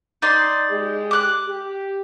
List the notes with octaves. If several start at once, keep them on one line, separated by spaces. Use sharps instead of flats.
D#4 D5 C6
G#3 G4
D6 F#6
G4